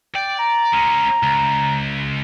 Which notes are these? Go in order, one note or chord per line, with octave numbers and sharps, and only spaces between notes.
D5 G5
A#5
G#3 C#4
C#2